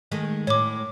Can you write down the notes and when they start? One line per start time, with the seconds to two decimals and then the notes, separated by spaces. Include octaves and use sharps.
0.12 D#3 G#3 A3
0.47 A2 C#5 D6